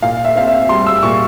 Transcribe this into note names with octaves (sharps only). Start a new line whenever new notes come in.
A#2 F5
E5
C4 F5
E5
G3 C6
E6
A#2 C#6